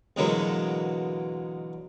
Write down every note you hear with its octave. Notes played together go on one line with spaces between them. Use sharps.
E2 B2 D3 F#3 G#3 A#3